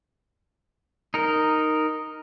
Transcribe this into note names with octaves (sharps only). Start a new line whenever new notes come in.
D#4 A#4